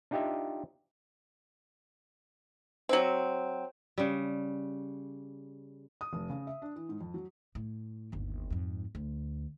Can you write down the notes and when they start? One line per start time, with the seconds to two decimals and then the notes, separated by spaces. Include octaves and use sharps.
0.11 D4 D#4 F4 G4 D#5 E5
2.89 F#3 C4
3.98 C#3 G3
6.01 D#6
6.13 F1
6.30 C#3
6.47 E5
6.62 D4
6.76 E3
6.89 G#2
7.01 F2
7.14 F#3
7.55 A2
8.12 G1 D#2
8.50 F2 G#2
8.95 D2